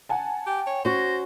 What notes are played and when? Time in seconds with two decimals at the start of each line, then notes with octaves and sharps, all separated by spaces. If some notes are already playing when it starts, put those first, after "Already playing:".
0.09 F#5 G#5 A5
0.46 G4 G5
0.67 C#5
0.85 C#4 F#4 C5 A#6